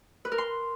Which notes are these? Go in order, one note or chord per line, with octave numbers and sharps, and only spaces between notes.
B4
A#4
C6